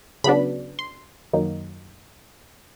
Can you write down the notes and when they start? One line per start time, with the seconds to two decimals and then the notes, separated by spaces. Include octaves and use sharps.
0.24 C#3 F#3 B3 D4 B5
0.79 C6
1.33 F#2 D#3 F#3 A#3 D#4